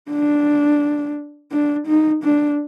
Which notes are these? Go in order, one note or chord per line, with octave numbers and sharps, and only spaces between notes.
D4
D4
D#4
D4